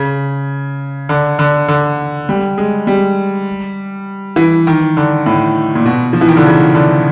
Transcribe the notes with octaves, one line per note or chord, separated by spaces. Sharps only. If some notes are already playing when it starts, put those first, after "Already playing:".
Already playing: C#3
D3
D3
D3
G3
G#3
G3
E3
D#3
D3
A2
A#2
B2
F3
E3
D#3
D3
C#3
D3